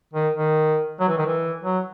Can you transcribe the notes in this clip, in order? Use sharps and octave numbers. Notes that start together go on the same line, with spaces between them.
D#3
D#3
F#3
E3
D#3
E3
F#3